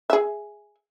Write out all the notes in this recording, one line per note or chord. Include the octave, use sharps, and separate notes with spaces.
G#4 E5